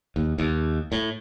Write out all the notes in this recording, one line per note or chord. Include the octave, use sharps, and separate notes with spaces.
D#2
D#2
A2